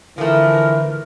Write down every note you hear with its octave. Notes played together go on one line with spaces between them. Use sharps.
D3 E3 F3 A3 A#4